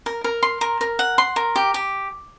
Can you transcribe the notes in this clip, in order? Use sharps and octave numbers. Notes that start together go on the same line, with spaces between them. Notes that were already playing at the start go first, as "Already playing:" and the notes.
A#4
A#4
C6
A#4
A#4
F#5
C6
A#4
G4
G4